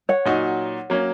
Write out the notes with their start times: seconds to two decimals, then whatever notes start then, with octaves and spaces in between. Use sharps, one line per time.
0.09 C#5 F#5
0.25 A#2 F#3 D#4 F#4
0.90 F#3 A#3 C#4